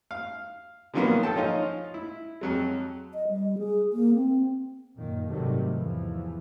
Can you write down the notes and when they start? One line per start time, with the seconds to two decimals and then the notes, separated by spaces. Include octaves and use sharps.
0.11 F5
0.94 D3 D#3 F3 F#3 A#3 B3
1.23 A4 G5 A5
1.36 F3 C#4 D#4 F4
1.94 E4
2.41 F2 F#3 G#3
3.14 D#5
3.28 G3
3.58 G#4
3.93 A#3
4.15 C4
4.95 F#2 A#2 D#3
5.27 G#2 C3 D#3 F#3 G3 A3
5.72 E2 E3 F3